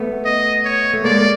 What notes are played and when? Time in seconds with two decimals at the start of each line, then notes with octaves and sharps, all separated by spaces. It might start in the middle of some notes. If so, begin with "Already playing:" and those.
Already playing: A3 B3
0.25 D#5
0.65 C#5
0.93 A3
1.04 G#3 A#3 D5
1.19 A#3